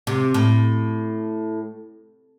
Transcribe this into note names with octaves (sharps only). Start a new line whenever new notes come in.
C3
A2